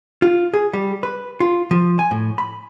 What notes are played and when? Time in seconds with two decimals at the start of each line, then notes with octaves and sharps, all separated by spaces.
0.22 F4
0.54 G#4
0.73 G3
1.03 B4
1.40 F4
1.71 F3
1.99 G#5
2.11 A2
2.38 B5